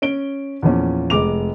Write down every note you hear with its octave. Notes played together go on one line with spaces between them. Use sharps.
C#4 D7 G7
E2 A#2 F3 C#4
F1 G#3 D6 F7